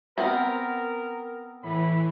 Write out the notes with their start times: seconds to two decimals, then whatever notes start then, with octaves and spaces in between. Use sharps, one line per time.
0.18 B3 C4 A#4 F#5
1.63 A2 E3 B5